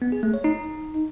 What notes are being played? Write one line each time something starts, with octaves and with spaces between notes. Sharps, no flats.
B3
G#4
A3
C#5
D#4